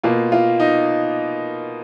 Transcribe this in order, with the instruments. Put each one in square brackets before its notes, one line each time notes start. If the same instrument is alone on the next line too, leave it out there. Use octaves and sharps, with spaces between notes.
[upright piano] B2 A#3 F4
F4
D#4